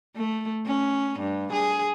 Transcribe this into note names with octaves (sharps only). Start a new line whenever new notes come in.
A3
C#4
G2
G#4